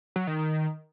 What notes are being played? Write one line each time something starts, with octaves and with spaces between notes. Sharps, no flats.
F#3
D#3
D#3